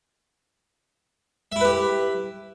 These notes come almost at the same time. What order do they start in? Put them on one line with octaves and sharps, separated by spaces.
E5 E4 B4 G4